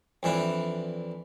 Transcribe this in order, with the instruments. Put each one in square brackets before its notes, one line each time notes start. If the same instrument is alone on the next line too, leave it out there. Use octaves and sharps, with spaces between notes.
[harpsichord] F2 E3 D4 E4